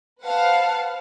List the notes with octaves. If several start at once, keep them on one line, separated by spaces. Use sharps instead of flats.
B4 C5 F5 F#5 A5